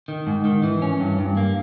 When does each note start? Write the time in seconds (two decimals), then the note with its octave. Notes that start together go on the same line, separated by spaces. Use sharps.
0.08 D#3
0.27 G#2
0.45 D#3
0.63 E3
0.82 C#4
1.00 G2
1.19 G2
1.37 A#3